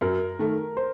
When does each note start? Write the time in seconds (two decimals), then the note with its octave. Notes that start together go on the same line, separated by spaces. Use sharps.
0.01 F#2 A#4
0.39 D#3 A3
0.77 C5